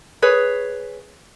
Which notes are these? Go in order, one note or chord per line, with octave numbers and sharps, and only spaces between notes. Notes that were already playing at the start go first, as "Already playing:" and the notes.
G#4 B4 C#5